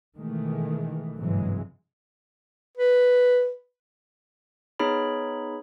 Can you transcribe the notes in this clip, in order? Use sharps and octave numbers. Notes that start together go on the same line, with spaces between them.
B2 D#3 E3 G#3 A3
G1 G#2 C3 E3 F#3 G#3
B4
B3 D#4 G#4 C#5 B5